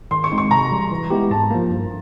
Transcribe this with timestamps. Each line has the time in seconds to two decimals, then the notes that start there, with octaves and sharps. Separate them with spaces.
0.11 D#3 C6
0.24 C#6
0.31 G#3 C4 D#4
0.38 C#6
0.51 C3 A#5
0.71 E3 G3
0.91 E3
1.10 G#3 B3 E4 G4
1.31 G#2 A5
1.51 F3 A#3
1.70 G2